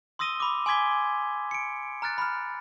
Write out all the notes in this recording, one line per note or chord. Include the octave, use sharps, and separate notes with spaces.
C6 D#6 E6 A#6 D#7 G7
B5 D6
G#5 C6 D6 G#6 B6 G7
C#7 D7
A#5 F6 F#6 A6 D7
B5 F6